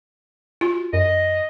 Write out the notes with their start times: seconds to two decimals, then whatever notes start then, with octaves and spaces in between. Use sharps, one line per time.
0.61 F4 F#4
0.93 F#2 D#5